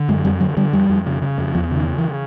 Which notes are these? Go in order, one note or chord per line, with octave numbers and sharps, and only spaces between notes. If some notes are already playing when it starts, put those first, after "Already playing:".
Already playing: D3
F#2 G#3
F2 G3
D3 F#3
D3 G3
F2 G3
F2
C#3
C#3
F2
E2 F3
C#3
D#3
C#3
E3